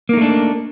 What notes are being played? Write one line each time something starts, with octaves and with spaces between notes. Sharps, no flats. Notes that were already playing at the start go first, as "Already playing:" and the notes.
A3 A#3 D4 D#4